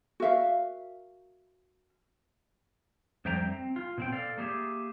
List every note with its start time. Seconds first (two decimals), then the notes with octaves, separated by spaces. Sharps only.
0.20 F#4 A#4 E5 F5
3.25 F2 G3 C5 E5 G5 A#5
3.48 C4
3.76 F4
3.98 B2 C4 G5
4.12 A4 D5 F5
4.38 A#3 G4 G#4 C#5 E5